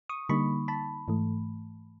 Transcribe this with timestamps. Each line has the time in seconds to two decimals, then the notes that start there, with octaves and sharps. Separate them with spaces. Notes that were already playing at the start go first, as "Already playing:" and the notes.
0.09 C#6 D#6
0.29 D3 G3 A#3 D#4 B5 C#6
0.68 A5 B5
1.08 G#2 E3 A3